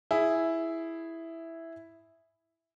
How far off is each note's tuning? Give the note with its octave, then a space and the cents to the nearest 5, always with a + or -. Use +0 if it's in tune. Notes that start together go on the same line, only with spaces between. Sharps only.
E4 +0 G#4 +0